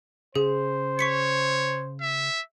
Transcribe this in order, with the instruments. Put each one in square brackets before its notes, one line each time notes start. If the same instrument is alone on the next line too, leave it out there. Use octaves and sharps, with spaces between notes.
[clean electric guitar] C#3 [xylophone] G#4 [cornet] C5
[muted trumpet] C#5 [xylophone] C#6 B6 C#7
[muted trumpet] E5